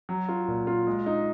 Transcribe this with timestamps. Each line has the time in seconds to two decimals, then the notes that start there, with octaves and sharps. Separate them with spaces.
0.09 F#3
0.28 F4
0.48 A#2
0.67 F4
0.87 G#3
1.06 D#4